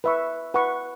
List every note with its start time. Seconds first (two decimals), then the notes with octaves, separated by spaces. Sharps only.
0.04 B4 E5 C#6
0.54 B4 F#5 C#6